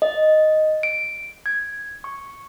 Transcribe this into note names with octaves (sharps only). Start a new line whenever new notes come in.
D#5
D7
G#6
C#6